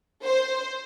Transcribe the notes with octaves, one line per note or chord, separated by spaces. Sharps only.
C5